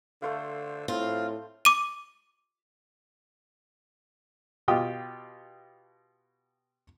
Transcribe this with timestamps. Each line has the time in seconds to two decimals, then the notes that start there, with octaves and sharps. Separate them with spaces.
0.22 D3 A3 C5 F5
0.88 A2 C4 F4
1.65 D6 D#7
4.68 B2 F4 G4 G5 D#6